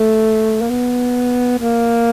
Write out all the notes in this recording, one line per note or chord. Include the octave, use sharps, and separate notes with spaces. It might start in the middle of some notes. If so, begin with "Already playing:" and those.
Already playing: A3
A#3
B3
A#3